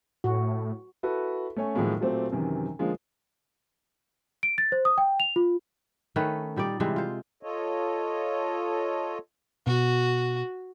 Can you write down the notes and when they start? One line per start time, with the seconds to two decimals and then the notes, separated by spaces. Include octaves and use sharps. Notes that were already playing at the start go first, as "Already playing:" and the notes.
0.24 A2 F#4
1.03 E4 F#4 A4 B4
1.56 A3 C#4 C#5 G#5
1.75 A2 D#3 F3 F#3 G#3 A#3
2.00 A#2 F#3 A3 C4 G4
2.32 F#2 C3 D#3 E3
2.79 D3 F3 G#3 A#3
4.43 D7
4.58 A6
4.72 C5
4.85 D#6
4.98 G5
5.20 F7
5.36 F4
6.16 D#3 A3 C#4 B4
6.56 A#2 G3 D#4 D5
6.80 C3 E3 G3 G#3
6.96 F4 C5
7.43 F4 A4 C#5 D#5
9.67 B2 F#4